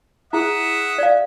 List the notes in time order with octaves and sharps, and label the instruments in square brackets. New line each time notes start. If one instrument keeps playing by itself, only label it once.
[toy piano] E4 G#4 [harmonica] E5 F#5 D#6
[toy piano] D5 F5